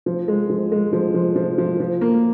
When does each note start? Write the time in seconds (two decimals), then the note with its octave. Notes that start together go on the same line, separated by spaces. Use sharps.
0.06 F3
0.28 G#3
0.50 F3
0.72 G#3
0.93 F3
1.14 F3
1.36 F3
1.58 F3
1.80 F3
2.01 A#3